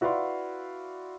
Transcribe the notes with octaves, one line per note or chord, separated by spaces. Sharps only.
E4 F#4 B4 D5 F5 C6